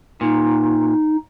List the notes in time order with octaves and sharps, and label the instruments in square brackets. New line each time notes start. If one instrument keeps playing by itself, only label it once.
[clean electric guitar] A#2 [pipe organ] D#4